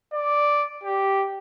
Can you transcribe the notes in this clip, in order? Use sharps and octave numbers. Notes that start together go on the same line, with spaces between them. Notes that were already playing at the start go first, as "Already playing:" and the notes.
D5
G4